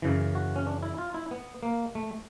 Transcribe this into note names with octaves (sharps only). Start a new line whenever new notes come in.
F#2 C#3 E3
F#4
C#4
D4
E4
F4
E4
B3
A#3
A3